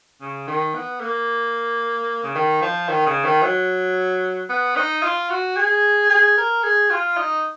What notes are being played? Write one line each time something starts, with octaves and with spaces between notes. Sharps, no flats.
C#3
D#3
B3
A#3
C#3
D#3
F3
D#3
C#3
D#3
F#3
B3
D#4
F4
F#4
G#4
G#4
A#4
G#4
F4
D#4